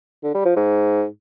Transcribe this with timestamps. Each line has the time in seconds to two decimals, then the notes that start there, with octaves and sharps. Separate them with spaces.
0.23 D3
0.34 G3
0.45 F3
0.56 G#2